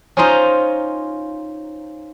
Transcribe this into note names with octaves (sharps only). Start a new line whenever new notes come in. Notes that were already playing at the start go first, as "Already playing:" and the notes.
C#4 D#4 F4 C5 D#5 A#5